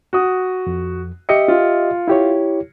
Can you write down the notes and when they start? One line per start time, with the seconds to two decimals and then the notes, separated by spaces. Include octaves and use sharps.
0.13 F#4 D#6
0.67 F2
1.29 G4 D#5 E5 C#7
1.48 F4
2.08 E4 G4 C#5